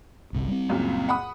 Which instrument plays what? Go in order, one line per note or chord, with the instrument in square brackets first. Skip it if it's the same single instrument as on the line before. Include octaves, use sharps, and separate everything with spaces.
[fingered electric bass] G1 C2 C3
G3 C4
[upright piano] C#2 F#2 A#2
F#5 B5 D#6